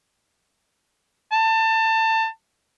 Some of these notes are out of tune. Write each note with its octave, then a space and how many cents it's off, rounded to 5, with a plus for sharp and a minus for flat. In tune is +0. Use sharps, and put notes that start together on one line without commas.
A5 +25